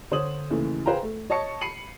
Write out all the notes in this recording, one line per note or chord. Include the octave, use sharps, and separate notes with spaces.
D3 C5 C#5 D#6 F#7
D#2 C#3 E3 A3
G#4 B4 C5 F5 G5 A#5
A3
C#5 D#5 A5 C#6 C#7
B5 C7 C#7 D#7 F#7